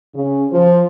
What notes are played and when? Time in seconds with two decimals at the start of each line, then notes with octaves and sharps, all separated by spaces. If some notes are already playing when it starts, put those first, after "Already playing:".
0.15 C#3
0.52 F3